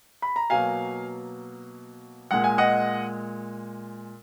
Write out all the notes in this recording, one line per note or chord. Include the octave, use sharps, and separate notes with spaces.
B5
A#5
B2 F#3 A#3 F5 G#5
A#2 G#3 F#5
G#5
D#5 F#5